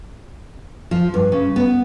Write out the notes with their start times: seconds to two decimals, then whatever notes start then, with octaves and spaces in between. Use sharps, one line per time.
0.91 F3
1.14 G2
1.32 C#3
1.56 B3